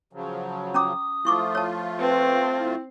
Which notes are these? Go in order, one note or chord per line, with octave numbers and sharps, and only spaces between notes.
C#3 F3 F#3
C#4 A#5 D6 D#6
F3 A3 E4 F4 C#6 D6
C#5 A5
C4 B4
E4